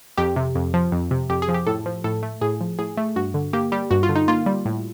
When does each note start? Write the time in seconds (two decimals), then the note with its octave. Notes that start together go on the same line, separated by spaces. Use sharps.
0.17 F2 G4
0.36 C3
0.55 F2
0.74 F3
0.92 F2
1.11 C3
1.30 F2 G4
1.42 G#4
1.48 F3
1.54 G4
1.67 A2 A4
1.86 F3
2.04 A2 A4
2.23 A3
2.41 A2 G#4
2.61 F3
2.79 A2 G#4
2.97 A3
3.16 G2 F#4
3.34 D3
3.53 A#3 G4
3.72 G3 G4
3.91 G2 F#4
4.03 F4
4.09 D3
4.15 D#4
4.28 A#3 F4
4.46 G3
4.65 A2